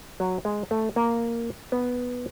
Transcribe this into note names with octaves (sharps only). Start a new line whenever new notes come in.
F#3
G#3
A3
A#3
B3